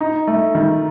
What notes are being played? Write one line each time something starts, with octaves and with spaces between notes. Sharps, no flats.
D#4
A3
D#3